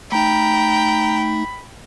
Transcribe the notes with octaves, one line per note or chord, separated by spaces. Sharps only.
A3 D#4 G5 A#5 B5